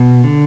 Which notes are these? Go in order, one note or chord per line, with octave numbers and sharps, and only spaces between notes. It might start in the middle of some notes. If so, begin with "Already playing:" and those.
Already playing: B2
D3